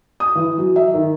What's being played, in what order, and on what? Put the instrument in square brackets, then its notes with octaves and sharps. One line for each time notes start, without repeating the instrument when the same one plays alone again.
[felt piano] D#6
E3
F#3
E5
D#3